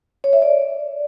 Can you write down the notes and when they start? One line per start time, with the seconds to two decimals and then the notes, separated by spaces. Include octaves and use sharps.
0.24 C#5
0.33 E5
0.42 D5